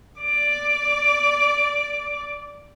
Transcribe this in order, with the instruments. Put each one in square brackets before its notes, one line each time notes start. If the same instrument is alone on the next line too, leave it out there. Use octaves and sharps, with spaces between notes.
[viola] D5 D6